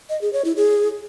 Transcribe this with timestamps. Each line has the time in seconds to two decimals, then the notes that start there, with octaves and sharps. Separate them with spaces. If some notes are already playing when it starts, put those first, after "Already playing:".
0.10 D#5
0.21 G#4
0.33 C#5
0.45 E4
0.56 G#4